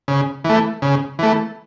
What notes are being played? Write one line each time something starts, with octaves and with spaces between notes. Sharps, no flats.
C#3
E3 A3
C#3
E3 A3